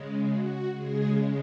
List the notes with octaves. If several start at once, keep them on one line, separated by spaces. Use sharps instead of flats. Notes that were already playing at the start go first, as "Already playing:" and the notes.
Already playing: C#3 G#3
F#4
C#3 G#3 G#4